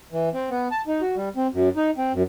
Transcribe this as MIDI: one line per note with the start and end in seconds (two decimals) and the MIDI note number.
0.12 0.29 52
0.34 0.50 60
0.50 0.68 59
0.71 0.82 81
0.87 1.01 63
1.01 1.16 66
1.16 1.29 55
1.36 1.47 60
1.53 1.69 42
1.76 1.90 63
1.98 2.12 60
2.13 2.23 42